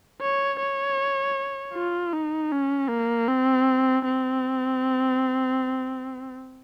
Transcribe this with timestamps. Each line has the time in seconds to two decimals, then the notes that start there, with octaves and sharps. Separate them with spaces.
0.21 C#5
0.59 C#5
1.74 F4
2.13 D#4
2.52 C#4
2.89 A#3
3.28 C4
4.05 C4